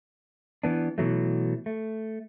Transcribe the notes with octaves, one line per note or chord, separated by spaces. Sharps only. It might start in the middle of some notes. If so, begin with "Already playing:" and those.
E3 B3 D4
B2 E3 F#3 A3
A3